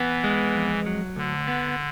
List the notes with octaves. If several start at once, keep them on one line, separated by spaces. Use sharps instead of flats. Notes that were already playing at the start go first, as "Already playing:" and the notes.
Already playing: E3 B3
G#3
F2
F#3
D2 D3
B3